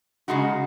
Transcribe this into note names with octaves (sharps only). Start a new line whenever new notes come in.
C#3 G#3 D#4 F#4